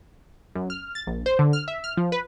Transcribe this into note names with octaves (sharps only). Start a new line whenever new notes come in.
F#2
F6
A6
A#1
C5
D3
F6
E5
F6
F3
B4